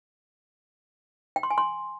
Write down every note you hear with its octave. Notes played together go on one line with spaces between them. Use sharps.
G5
C6
G#5
C6